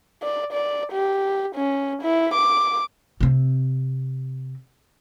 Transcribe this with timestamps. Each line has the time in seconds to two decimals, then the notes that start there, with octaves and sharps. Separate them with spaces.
0.23 D5
0.53 D5
0.92 G4
1.56 C#4
2.03 E4
2.34 D6
3.20 C3 C4